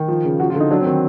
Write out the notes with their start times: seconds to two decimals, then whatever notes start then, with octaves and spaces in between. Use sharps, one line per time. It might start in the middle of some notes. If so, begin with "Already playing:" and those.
Already playing: D#3
0.08 F3
0.24 C#3
0.40 F3 F#4
0.50 F4
0.55 D3 D#4
0.71 F#3 D4
0.81 C4
0.86 D#3